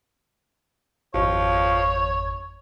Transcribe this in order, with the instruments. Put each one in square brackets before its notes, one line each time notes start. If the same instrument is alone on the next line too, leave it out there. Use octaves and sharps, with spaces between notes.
[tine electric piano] G#1 F2 [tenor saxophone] F3 [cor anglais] C#5